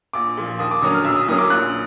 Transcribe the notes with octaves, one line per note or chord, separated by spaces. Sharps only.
A#1 D6
A#2 F3
D#2 D#6
D6
D3 F#3 A#3 C#4 D#6
F6
B1 E6
D#6
A2 F#3 A#3 C#4 D#6
D6
A#1 F#6